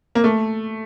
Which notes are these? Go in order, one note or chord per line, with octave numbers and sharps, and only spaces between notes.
A#3
A3